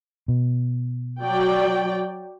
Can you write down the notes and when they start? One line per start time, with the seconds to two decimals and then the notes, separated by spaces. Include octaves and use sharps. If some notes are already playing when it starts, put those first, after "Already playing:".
0.28 B2
1.23 F#3 D5 G5